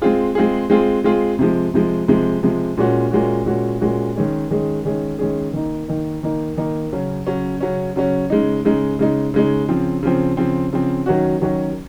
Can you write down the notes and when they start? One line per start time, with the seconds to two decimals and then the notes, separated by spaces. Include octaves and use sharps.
0.02 G#3 C4 F4 G#4
0.35 G#3 C4 F4 G#4
0.70 G#3 C4 F4 G#4
1.04 G#3 C4 F4 G#4
1.39 C3 F3 G#3
1.74 C3 F3 G#3
2.08 C3 F3 G#3
2.43 C3 F3 G#3
2.78 A#2 G#3 C#4 F#4
3.11 A#2 G#3 C#4 F#4
3.46 A#2 G#3 C#4 F#4
3.80 A#2 G#3 C#4 F#4
4.16 D#3 G#3 C#4 G#4
4.50 D#3 G#3 C#4 G#4
4.85 D#3 G#3 C#4 G#4
5.19 D#3 G#3 C#4 G#4
5.53 D#3 A#3 D#4
5.88 D#3 A#3 D#4
6.23 D#3 A#3 D#4
6.57 D#3 A#3 D#4
6.93 C#3 F#3 C#4
7.27 C#3 F#3 C#4
7.61 C#3 F#3 C#4
7.96 C#3 F#3 C#4
8.30 C#3 G#3 D#4
8.65 C#3 G#3 D#4
8.99 C#3 G#3 D#4
9.34 C#3 G#3 D#4
9.69 C#3 F3 C4
10.03 C#3 F3 C4
10.37 C#3 F3 C4
10.73 C#3 F3 C4
11.06 D#3 F#3 C#4 F#4
11.42 D#3 F#3 C#4 F#4